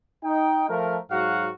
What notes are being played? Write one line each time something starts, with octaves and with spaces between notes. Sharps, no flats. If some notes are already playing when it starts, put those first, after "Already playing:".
D#4 G5
F3 A3 A#4
G#2 F#3 F#4 F5 F#5